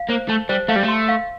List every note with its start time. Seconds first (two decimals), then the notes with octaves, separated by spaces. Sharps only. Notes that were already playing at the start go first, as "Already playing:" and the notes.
Already playing: F5
0.10 A#3 C5
0.29 A3 A5
0.49 G3 C5
0.68 A3 F5
0.76 G3
0.83 A3
0.88 C6
1.09 F5